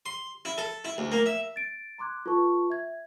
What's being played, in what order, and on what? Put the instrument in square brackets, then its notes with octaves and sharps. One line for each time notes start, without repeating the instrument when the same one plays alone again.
[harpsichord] C6
E4
A4
E4
D2
A#3
E5
[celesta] A6 D7
A#5 C6 D6 F#6 G#6
F4 A4 B4 A5 C#6
E5 G#6